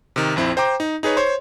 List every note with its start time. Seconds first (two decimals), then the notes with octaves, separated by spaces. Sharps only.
0.16 C3 D#3
0.36 A#1 F2 C4 E4
0.57 C5 G5 A#5 D6
0.80 D#4
1.03 D#4 G#4 B4 C#5
1.17 C5 C#5 C6